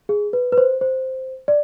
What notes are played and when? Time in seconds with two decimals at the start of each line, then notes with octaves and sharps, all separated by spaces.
0.09 G#4
0.33 B4
0.52 B4
0.58 C5
0.81 C5
1.48 D5